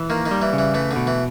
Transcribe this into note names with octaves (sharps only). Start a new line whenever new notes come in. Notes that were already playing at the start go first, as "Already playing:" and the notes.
Already playing: E3
D#3 A#3
D#3
G3
E3
C#3
E3
E3 A3
D3
B2
E3